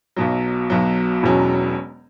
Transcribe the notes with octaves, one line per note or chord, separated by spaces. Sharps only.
B1 B2 F#3
B1 B2 F#3
E1 E2 B2 F#3 C#4